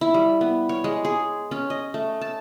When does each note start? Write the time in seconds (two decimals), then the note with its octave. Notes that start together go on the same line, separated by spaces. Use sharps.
0.01 E4
0.14 G3
0.41 B3
0.69 C#5
0.84 G#3
1.05 G#4
1.51 C#4
1.70 D#5
1.94 A3
2.21 A5